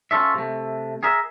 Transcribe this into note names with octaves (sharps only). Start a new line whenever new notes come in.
C#4 F4 A4 E5
C3 A3
G#4 A#4 E5